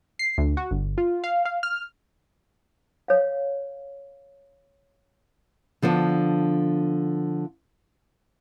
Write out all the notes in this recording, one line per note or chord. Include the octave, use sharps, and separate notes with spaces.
C7
D2
F#4
G1
F4
F5
F5
F6
C#5 F5
D3 F3 B3 D4